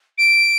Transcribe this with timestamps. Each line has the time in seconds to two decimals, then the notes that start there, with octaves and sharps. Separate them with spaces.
0.18 D7